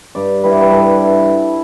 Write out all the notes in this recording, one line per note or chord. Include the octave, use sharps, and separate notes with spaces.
G2 D5
G3 E4 B4
D5
B4
G2 A4
E4